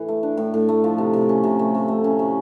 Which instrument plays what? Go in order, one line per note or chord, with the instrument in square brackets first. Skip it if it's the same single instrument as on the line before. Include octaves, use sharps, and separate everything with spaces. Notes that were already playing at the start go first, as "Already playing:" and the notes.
Already playing: [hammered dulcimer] A2 E3
A3
D4
A2
A2
A3
F3
C3
C3
C#4
C3
A3
C3
A3
C#4
C3